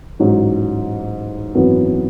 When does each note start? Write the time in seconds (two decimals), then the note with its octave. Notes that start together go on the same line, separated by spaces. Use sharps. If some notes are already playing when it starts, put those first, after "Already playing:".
0.19 A1 G#2 F#3
1.55 G#1 F#2 E3 B3 F#4